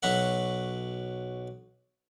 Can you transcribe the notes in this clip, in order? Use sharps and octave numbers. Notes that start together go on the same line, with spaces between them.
B1 F#3 F#4 E5 F#5